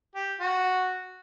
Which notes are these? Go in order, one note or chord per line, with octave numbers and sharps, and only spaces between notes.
G4
F#4